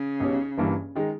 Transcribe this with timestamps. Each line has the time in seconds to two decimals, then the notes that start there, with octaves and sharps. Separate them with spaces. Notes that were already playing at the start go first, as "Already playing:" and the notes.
Already playing: C#3
0.20 B1 B2 G3 C#4
0.58 G1 G2 E3 A#3
0.95 D#3 G#3 D#4